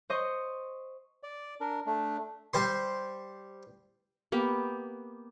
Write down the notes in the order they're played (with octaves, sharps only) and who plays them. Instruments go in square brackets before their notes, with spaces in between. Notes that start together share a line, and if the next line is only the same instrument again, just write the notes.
[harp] C5 D#5 C#6
[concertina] D5
D4 A#4
A3 D4
[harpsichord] G3 C5 C6
[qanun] A#3 B3 G4